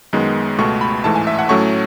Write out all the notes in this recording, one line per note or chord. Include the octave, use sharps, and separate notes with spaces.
F#2 D#3 G#3 B3
C#2 B2 A3 C#6
B5
A1 G#2 E3 A3 A5
G#5
E5
F#5
A2 F#3 A3 C#4 C#6